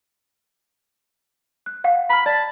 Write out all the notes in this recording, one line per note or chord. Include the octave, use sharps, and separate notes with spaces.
F#6
F5 F#5
A#5 B5 F6
D5 A5